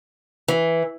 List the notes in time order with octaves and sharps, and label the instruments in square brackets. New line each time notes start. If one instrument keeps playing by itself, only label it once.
[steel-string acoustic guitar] E3